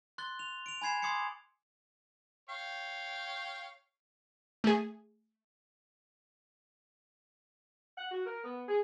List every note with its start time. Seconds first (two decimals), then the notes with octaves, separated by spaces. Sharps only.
0.18 C6 F#6 A6 G7
0.39 F7
0.66 D7 F7
0.82 G#5 B5 G#6 C7 E7
1.02 C6 D6 D#6 G#6 C7 C#7
2.49 C#5 F5 G5
4.64 A3 G#4
7.97 F#5
8.12 F#4
8.26 A#4
8.44 B3
8.69 G#4